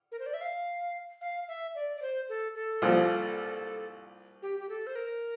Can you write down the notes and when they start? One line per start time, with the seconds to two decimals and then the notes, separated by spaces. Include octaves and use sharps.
0.12 A#4
0.19 C5
0.26 D5
0.34 E5
0.41 F5
1.21 F5
1.48 E5
1.75 D5
1.97 D5
2.02 C5
2.29 A4
2.55 A4
2.82 C2 A#2 F3
4.42 G4
4.59 G4
4.69 A4
4.87 C5
4.96 A#4